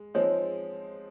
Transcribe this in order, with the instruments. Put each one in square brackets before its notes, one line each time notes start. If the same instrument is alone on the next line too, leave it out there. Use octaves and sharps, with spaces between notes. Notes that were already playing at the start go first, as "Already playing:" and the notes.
Already playing: [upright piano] G#3
[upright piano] F3 G#3 C4 D#4 [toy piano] C#5